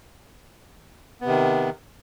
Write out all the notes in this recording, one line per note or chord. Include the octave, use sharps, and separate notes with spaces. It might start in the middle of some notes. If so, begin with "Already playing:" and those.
C3 D#3 B3